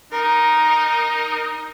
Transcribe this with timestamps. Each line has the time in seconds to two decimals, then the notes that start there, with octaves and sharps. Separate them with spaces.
0.12 D#4 A#4